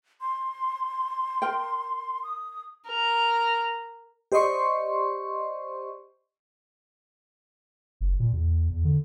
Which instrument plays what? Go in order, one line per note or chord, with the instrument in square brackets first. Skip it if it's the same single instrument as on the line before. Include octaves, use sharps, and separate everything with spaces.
[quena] C6
[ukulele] A#4 G5
[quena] D#6
[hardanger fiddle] A#4
[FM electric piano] G4 C5 D5 D#5 C6 C#6
[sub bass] F#1
A#2
E2
E2
D3